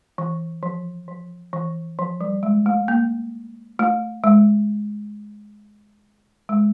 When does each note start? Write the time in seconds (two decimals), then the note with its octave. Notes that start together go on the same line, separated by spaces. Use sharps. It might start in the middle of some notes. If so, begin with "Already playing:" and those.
0.18 E3
0.63 F3
1.08 F3
1.53 E3
1.99 F3
2.21 G3
2.43 G#3
2.66 A3
2.88 A#3
3.79 A3
4.24 G#3
6.49 G#3